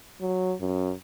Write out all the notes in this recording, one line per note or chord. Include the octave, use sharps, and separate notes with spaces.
F#3
F#2